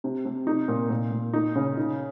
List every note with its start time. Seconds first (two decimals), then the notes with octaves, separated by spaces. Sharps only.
0.04 C3
0.25 C3
0.47 D#4
0.68 A#2
0.90 A#2
1.11 A#2
1.33 D#4
1.55 C#3
1.77 D#4